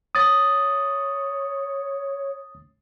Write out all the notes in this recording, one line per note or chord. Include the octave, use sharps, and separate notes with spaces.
C#5 D#6 A6